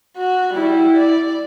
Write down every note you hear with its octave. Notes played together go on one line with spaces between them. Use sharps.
F#4
G3 E4
D5